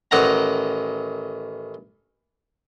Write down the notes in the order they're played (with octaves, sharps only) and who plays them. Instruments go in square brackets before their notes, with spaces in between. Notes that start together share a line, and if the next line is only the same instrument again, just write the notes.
[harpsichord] A1 D#3 F#5 A#5